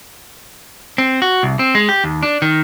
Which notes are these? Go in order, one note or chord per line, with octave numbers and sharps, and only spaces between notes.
C4
F#4
C2
C4
G#3
G4
D#2
D4
D#3